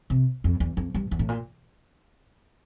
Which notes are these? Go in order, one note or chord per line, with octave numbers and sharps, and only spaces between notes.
C3
F2
E2
F2
G2
E2
A2
A#2